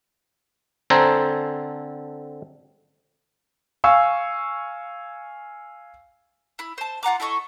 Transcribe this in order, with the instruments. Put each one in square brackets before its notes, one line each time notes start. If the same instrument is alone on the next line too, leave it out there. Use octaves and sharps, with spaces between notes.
[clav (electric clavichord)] D3 C4 A4 C5 G#5 A#5
[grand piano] F5 G#5 C#6 E6
[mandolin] E4 B5
C5 A5
F4 F#5 A#5 D6
E4 A4 D#5 C#6